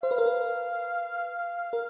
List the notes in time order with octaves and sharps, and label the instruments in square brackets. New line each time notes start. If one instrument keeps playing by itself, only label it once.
[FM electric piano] C5 [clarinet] F5
[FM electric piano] B4
A#4
B4
A#4